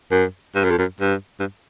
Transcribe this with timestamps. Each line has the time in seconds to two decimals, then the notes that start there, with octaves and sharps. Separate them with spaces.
0.11 F#2
0.55 G2
0.64 F#2
0.71 F2
0.78 F#2
1.01 G2
1.40 G2